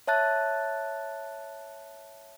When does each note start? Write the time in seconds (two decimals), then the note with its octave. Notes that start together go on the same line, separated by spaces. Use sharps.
0.07 C#5 E5 A5 F#6 A6